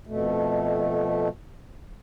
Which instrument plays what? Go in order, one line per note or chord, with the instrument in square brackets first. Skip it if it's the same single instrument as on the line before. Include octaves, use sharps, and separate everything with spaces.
[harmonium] F2 B2 A3